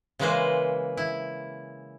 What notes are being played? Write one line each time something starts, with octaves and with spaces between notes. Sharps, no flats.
C#3 E3 G#3 A#3 B4 C5
E4